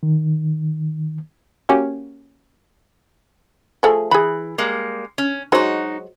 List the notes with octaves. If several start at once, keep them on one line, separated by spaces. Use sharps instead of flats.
D#3
A#3 C#4 F#4 G4
F3 A3 G#4
E3 G#4 B5
G3 G#3 A#3
C#4
F#3 G#3 D#4 F#4 C5